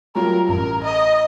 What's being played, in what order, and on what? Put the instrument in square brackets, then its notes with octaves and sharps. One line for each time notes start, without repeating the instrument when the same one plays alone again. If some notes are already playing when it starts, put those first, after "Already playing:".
[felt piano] F#3 G3 F4 [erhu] A#4
[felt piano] A1 [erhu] A#4
[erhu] D#5